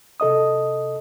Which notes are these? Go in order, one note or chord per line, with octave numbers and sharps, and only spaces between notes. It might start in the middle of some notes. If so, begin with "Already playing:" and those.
C3 A4 D#5 D#6